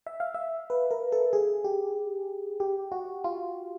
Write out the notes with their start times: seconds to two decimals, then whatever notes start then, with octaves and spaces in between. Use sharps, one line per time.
0.07 E5
0.20 F5
0.34 E5
0.70 B4
0.91 A#4
1.12 A4
1.33 G#4
1.64 G4
2.60 G4
2.92 F#4
3.24 F4